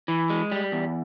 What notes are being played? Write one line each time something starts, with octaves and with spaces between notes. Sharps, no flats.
E3
G#3
G3
E2